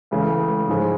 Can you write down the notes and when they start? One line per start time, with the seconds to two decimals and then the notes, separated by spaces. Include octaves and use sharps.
0.11 C#2 C#3 E3 A3
0.68 G#2 F3 G#3